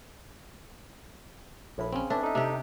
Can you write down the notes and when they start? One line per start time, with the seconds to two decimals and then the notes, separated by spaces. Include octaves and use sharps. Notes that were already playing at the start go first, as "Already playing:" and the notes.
1.78 A#1 A2 B5
1.93 C#3 C4 C#4
2.10 A2 D4 B4 E5
2.23 D#4 A4 E5
2.35 C3 D4 G4